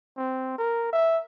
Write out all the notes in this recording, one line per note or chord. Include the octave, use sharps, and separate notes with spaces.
C4
A#4
E5